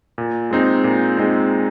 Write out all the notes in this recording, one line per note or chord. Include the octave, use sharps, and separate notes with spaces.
A#2
G#3 C4 D#4
A#2
G#3 C4 D#4